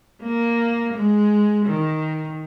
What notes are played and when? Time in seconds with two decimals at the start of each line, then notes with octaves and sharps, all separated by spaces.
0.23 A#3
0.94 G#3
1.65 D#3